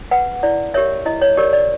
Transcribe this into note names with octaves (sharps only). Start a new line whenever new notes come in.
B4 F#5
E4 D5
G4 A#4 C#5 E5
E4 D#5
C#5
G4 A#4 C#5 D5
D5